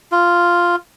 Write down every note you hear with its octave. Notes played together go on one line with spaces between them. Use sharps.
F4